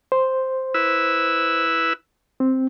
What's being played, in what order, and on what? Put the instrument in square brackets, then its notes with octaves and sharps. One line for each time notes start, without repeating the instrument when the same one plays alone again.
[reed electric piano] C5
[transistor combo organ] E4 B4 E6
[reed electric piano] C4